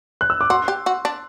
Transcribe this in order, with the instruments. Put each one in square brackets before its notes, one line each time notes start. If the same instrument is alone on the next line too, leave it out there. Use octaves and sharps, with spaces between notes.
[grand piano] F#6
E6
D6
[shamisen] F#4 [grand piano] C6
[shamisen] G4
F#4
D4